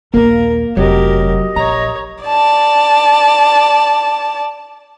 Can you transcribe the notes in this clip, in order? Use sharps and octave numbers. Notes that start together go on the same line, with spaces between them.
A#1 D#2 A#3 A#4
F1 F#3 G4 A#4 D#5
A#1 C#5 A#5
D5 A5